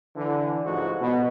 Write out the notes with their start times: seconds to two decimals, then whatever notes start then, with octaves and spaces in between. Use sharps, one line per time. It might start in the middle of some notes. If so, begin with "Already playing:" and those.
0.16 D3 E3
0.66 A1 G#2 F3 F#4
1.00 B2